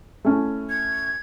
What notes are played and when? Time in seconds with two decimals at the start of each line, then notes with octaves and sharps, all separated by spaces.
0.25 A3 C#4 E4
0.70 G#6